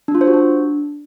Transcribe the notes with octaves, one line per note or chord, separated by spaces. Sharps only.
D4
F4
C5
F#4
D4